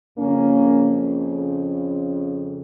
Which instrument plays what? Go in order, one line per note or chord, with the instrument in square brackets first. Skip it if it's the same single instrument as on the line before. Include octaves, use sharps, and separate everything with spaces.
[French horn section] F2 C#3 A#3 C#4